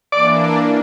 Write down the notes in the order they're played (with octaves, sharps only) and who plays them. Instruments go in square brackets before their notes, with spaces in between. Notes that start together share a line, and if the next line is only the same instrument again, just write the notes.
[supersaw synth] E3 A#3 D4 [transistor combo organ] D5